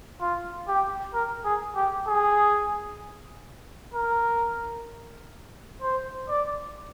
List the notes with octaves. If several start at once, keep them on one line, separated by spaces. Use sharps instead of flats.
F4
G4
A#4
G#4
G4
G#4
A#4
C5
D5